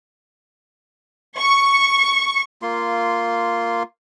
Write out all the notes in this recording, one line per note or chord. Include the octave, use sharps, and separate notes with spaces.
C#6
A#3 F4 C6